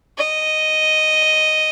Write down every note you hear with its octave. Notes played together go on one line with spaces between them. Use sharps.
D#5